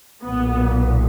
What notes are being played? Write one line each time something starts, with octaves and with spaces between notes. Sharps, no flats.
B1 A#2 B3